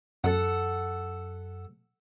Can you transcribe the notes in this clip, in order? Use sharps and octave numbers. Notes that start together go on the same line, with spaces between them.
F#2 A4 F#5